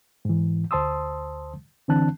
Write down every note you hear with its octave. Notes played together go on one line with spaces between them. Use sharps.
G#2 E3
D2 C5 A5 C6 D#6 E6
D3 E3 C4 D4 A5 F#6